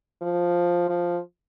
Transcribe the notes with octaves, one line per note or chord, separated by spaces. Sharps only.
F3
F3